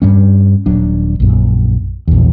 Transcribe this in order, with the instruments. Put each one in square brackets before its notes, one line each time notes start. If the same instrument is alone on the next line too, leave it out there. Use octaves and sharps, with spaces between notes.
[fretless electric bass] G2 G3 C#4
D#1 F#3 D4
A#1 F#2
A#1 E2